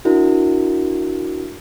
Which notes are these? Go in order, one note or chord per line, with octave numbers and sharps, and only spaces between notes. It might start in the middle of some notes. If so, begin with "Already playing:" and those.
D4 E4 F#4 A#4